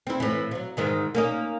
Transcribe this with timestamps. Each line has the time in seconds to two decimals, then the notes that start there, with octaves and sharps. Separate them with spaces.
0.07 C4 E4
0.20 A2 E3
0.51 F3 F#3
0.77 G#2 D#3 E3
1.15 A#3 C#4 D#4